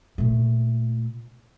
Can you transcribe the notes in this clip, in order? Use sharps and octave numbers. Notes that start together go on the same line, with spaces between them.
A#2 A3